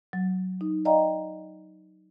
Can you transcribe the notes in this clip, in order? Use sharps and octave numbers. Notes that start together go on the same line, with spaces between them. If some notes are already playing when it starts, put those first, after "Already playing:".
F#3
D#4
D5 D#5 F5 G5 A#5